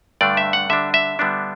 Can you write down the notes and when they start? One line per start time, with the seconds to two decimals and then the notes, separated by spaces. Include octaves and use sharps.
0.21 G2 D3 A3 D4 D5
0.37 E5
0.53 F#5
0.70 D3 G3 D4 E5
0.94 E5
1.19 D3 G3 B3 D4